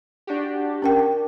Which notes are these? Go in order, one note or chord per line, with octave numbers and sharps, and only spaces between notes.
D4 F#4 G4
C#4 A#4 G5